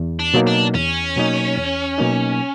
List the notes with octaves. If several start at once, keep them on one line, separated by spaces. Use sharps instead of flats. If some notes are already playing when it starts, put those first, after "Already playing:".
Already playing: E2
D4
B2 F#3 A#3 D#4
D4
E2 C#4
B2 F#3 A#3 D#4
E2
B2 F#3 A#3 D#4